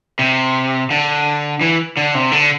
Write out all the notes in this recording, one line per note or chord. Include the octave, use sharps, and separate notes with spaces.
C3
D3
E3
D3
C3
D3